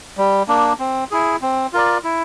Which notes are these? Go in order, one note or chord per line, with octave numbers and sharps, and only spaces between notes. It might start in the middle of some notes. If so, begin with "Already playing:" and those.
G3
A#3 D4
C4
E4 G#4
C4
F4 A#4 D5
E4